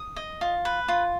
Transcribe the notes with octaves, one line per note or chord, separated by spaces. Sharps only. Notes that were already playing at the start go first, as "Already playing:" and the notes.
Already playing: D#6
D#5
F4
B4
F4